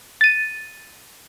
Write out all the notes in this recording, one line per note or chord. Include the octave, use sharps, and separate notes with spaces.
A6 D#7